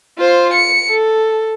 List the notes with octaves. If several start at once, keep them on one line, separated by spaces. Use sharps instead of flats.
F4 C5
C#7
A4